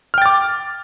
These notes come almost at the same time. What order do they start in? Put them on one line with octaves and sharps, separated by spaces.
F6 G5 A6 D6